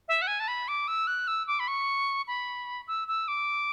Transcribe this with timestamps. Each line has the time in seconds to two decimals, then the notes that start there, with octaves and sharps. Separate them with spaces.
0.08 E5
0.22 F#5
0.27 G#5
0.40 A5
0.48 B5
0.68 D6
0.88 E6
1.07 F#6
1.28 E6
1.47 D6
1.60 B5
1.68 C#6
2.27 B5
2.88 E6
3.08 E6
3.28 D6